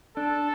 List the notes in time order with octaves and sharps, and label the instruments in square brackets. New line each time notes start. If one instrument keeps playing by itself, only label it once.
[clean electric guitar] D4 [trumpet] A4